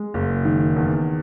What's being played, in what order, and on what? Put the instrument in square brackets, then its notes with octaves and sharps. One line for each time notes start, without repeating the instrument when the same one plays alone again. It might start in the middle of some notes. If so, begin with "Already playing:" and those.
Already playing: [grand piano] G#3
F#1
D#3
E2